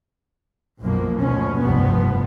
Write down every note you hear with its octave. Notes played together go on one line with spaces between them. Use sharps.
B1 F#2 B2 F3 A#3
D2 B2 F3 C#4
F1 C2 G2 C3 F3 B3